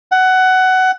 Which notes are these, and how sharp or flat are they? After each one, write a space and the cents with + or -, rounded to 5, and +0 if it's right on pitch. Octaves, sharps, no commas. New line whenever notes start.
F#5 +15